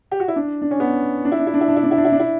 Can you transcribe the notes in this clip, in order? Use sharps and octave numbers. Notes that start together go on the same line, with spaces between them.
G4
F#4
E4
D4
D4
C#4
B3
D4
E4
D4
E4
D4
E4
D4
E4
D4
E4
D4
E4
D4
E4